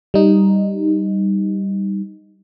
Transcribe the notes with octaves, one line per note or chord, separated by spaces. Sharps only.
G3 D#4